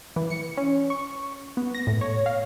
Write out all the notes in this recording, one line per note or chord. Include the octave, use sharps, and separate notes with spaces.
E3
C#7
C#4
C#6
B3
A#6
A2
C#5
F5